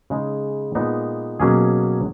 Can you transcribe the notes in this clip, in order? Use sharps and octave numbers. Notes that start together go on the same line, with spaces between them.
C#3 G#3 D#4
A#2 G#3 B3 D#4
B2 F#3 A#3 C#4 G#4